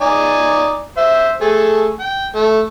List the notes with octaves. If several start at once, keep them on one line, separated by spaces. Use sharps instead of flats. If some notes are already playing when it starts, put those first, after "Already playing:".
D#4 D5 G#5
C5 E5
A3 G#4 A4
G5
A3